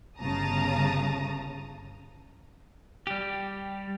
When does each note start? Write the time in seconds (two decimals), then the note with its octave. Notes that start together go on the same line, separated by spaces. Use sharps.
0.19 G1 C#3 A5 A#5 D#6
3.07 G3 G4